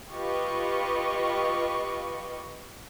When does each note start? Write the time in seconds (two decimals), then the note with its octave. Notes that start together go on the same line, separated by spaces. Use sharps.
0.11 F4 G4 B4 D#5 C#6